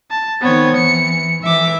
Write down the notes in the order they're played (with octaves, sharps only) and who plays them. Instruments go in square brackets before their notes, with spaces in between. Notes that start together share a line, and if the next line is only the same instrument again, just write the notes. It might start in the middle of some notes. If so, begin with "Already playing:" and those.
[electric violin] A5
[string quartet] D#3 C4 [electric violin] B3 C#5
[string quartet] E3 [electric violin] C#7
[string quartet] E3 D6 [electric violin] E5